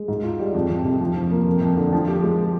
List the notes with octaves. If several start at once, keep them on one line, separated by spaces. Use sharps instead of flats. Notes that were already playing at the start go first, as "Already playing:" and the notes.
Already playing: G#3
G#2
F4
G3
F2
F2
C3
F3
F3
A#3
F2
F2
D3
F3
G4
G#3